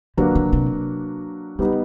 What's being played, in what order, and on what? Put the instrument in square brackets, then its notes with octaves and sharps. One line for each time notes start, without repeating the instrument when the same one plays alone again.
[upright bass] D3 [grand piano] F#3 A#3 D4 F#4 B4
[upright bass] C#3
C3
[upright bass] C#3 [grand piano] G3 B3 D#4